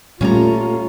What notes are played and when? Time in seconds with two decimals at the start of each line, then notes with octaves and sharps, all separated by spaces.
0.21 A#2 G3 A3 C#4 F4 A#5